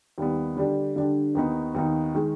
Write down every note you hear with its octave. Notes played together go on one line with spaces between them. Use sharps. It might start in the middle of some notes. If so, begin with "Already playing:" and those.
D#2 D#3 G3 B3
D3 G3 D4 G4
D3 G3 D4 G4
D#2 D#3 B3 D#4
D#2 D#3 B3 D#4
D#3 G#3